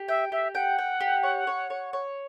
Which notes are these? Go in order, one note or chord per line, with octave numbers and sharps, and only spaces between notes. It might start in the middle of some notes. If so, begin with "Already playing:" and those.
Already playing: G4
E5 G5
G4 E5
F#5 G5
G5
G4
C#5
C#5
C#5
C#5